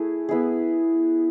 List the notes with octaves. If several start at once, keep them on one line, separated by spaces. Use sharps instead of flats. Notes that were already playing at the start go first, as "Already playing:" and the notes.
Already playing: A3 E4 G#4
B3 E4 G#4